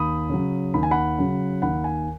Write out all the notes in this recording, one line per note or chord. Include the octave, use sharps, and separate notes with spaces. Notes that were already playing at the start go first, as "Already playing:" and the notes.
Already playing: D#2 B5 D#6
C#3 F#3
D#2 B5
G#5
F#5 B5
C#3 F#3
D#2 F#5 B5
G#5